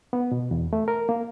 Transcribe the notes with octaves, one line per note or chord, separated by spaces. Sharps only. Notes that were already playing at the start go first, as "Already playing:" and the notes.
B3
B2
E2
A3
A#4
A#3